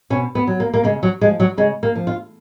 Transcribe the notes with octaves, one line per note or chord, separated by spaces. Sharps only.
B2 C#4
B3
F#3
A#3
A#3
C#3 G#3
F#3
F3 G#3
F#3
C#3 G#3
A#3
F3
F4